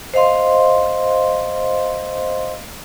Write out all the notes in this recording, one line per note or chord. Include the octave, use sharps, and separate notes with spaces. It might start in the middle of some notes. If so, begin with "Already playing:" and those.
C5 D#5 F5 C6